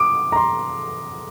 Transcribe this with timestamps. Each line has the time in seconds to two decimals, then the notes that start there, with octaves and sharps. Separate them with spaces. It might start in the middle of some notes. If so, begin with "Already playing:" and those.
Already playing: D6 D#6
0.32 A#5
0.36 C6